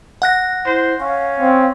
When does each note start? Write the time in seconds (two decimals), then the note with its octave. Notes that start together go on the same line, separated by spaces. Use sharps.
0.22 F#5 F#6 A#6
0.66 E4 C5
1.00 C#4 F5
1.40 C4